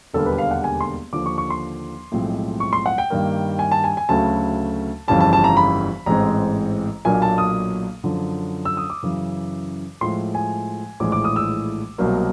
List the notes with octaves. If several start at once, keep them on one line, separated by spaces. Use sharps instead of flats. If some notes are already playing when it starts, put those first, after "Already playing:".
E1 D#2 D3 G3 A#3 A4
B4
F5
F#5
G#5
C6
D#2 D3 F3 D6
C#6
C#6
C6
B1 A2 F3 G#3 C4
C#6
C6
F#5
G5
G2 D#3 G3 A#3
G#5
A5
G#5
G#5
D2 C#3 F#3 A3 A5
G1 F2 C#3 E3 G3 A5
A5
A5
A#5
B5
A1 G#2 E3 G#3 C4 A#5
B1 A#2 F#3 A#3 D4 G#5
A5
D#6
F#2 D3 F3
E6
D#6
D6
F#2 C#3 E3
A2 F3 G#3 C6
G#5
A#1 A2 E3 G#3 D6
D6
D#6
E6
C2 B2 F#3 A#3